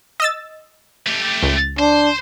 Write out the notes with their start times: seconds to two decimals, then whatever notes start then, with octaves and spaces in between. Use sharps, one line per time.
0.20 D#5 E6 A6
1.07 A3 G4
1.43 C#2
1.79 D4 C5